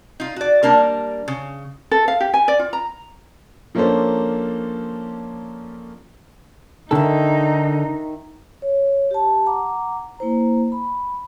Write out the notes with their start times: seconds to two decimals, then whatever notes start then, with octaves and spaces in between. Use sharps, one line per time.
0.20 D#4 F4
0.36 F#4 D5
0.63 G3 A#3 D4 A#4
1.28 C#3
1.91 A4
2.08 F5
2.21 G4
2.34 G#5
2.48 D5
2.59 F4
2.73 A#5
3.75 F3 A#3 C#4 D4 A4 C5
6.91 D3 D#3 D#4 A4 E5
8.62 C#5
9.11 G4 A5
9.46 F#5 A#5 D6
10.19 A#3 E4 C5 A#5
10.72 B5